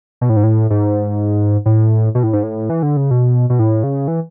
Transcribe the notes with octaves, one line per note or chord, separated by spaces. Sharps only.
B2
A2
G#2
A2
G#2
A2
B2
A2
G#2
A2
E3
D3
C#3
B2
B2
A2
C#3
E3